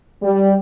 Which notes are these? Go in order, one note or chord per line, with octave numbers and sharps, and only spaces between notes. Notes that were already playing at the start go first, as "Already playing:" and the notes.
G3